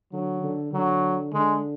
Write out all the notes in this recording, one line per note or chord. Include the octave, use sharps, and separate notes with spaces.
D3 F#3
D3
D3 F#3
D3 G#3